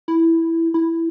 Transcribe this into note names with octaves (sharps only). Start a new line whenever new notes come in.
E4
E4